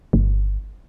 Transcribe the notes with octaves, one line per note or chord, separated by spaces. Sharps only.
G1